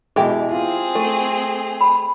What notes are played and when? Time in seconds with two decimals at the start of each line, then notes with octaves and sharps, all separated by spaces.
0.16 B2 E3 G#3 G4
0.52 C4 F4 G#4
0.95 A3
1.81 B5